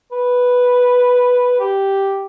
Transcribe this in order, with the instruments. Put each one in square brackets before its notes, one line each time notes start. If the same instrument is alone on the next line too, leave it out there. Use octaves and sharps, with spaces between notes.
[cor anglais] B4
G4